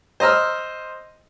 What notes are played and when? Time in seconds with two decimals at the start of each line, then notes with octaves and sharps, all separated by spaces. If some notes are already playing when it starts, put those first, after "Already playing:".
0.20 C5 D#5 A#5 E6 F6